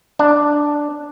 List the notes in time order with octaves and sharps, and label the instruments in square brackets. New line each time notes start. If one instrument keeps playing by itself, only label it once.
[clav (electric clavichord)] D4